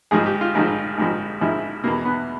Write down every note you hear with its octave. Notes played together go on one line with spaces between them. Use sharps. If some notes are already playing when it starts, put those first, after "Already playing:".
G#1 G#2 F3 G#4
G4
F4
G#1 G#2 F3
G#1 G#2 F3
G#1 G#2 F3 E4
E2 B2 A#3
B3